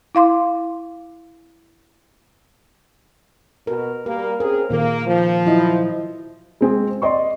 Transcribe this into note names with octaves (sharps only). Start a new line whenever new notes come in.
E4 F5 C6 D6
B2 A#4
G3 A#3 A#4
C4 C#4 G#4 A#4
A#2 D#3 A#3 A#4
F3
F#3 E4 D#5
G#3 C4 G#4
D5 D#5 C6 C#6